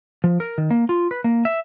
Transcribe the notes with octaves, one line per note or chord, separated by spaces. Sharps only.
F3
A#4
D#3
A#3
F4
B4
A#3
E5